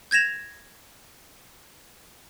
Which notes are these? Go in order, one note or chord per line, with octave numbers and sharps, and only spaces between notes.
G6 G#6 A#6 E7 F7